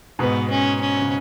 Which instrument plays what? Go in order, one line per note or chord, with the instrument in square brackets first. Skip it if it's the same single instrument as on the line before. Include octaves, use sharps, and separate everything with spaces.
[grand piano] G#2 B2 [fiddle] B3
[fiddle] C#4
C#4
[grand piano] C#3